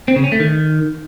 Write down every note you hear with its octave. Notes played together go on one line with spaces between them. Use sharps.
C4
C#3
C#4
A3
D#3